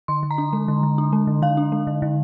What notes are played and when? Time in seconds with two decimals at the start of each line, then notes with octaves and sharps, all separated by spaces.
0.08 D3 C6
0.23 D3
0.31 A#5
0.38 D4
0.53 G#3
0.68 D3
0.83 D3
0.98 D4
1.13 G#3
1.27 D3
1.42 D3 F5
1.57 D4
1.72 G#3
1.87 D3
2.02 D3